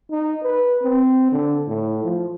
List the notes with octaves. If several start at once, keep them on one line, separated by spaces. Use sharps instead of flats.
D#4
B4
C4
D3
A2
F3